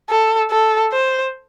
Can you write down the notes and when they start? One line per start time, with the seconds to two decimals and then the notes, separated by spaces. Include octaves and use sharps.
0.09 A4
0.51 A4
0.93 C5